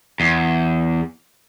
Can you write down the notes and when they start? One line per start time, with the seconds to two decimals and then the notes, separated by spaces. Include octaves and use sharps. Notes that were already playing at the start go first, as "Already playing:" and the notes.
0.20 E2